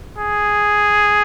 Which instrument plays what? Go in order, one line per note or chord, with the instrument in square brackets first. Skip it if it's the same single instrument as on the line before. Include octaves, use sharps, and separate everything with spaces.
[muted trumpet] G#4